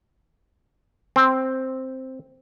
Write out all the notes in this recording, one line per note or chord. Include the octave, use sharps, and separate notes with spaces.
C4